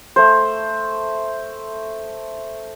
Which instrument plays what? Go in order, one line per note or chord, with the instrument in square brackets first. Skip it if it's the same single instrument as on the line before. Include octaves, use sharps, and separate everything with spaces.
[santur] A3 C5